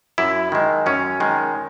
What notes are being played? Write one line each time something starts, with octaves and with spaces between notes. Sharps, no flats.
F#2 E4
D#3 G#3
F#2 C#4
D#3 G#3